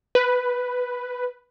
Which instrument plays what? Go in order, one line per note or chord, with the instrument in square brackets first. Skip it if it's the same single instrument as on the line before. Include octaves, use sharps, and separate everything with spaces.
[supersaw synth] B4